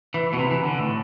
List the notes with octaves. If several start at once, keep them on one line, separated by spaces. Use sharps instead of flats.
E3
B2
C3
E3
D3
A2